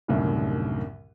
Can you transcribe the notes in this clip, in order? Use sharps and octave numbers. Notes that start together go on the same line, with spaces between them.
C2 F#2 A2 D3 D#3 G3